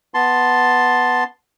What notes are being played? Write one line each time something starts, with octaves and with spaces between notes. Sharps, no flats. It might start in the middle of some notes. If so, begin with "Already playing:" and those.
B3 A5 C6